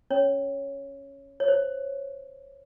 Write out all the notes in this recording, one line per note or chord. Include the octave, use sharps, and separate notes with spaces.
C#4 C#5
C#5
C5